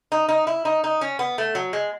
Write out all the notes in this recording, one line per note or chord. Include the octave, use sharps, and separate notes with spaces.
D#4
D#4
E4
D#4
D#4
C#4
B3
A3
F#3
G#3